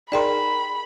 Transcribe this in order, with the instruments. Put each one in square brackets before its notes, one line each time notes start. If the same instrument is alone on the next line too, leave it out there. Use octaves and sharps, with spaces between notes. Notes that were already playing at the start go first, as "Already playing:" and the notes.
[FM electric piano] D#4 G#4 A#4 [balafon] D5 G5 C6 [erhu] B5